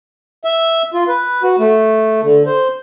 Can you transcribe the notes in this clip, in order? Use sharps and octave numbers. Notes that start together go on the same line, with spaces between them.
E5
F4
B4
F#4
A3
D3
C5